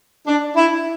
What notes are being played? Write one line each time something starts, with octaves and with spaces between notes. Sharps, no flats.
D4
E4